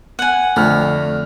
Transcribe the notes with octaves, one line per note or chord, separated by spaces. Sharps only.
F#5 G#5
F2 D3 A3 D4 F6